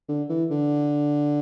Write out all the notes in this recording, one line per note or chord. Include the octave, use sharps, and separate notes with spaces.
D3
E3
D3